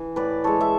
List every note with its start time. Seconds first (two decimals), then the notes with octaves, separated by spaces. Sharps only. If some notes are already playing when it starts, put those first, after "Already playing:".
Already playing: E3
0.16 A2 B4 D5
0.44 E3 G#3 A4 C#5
0.61 E5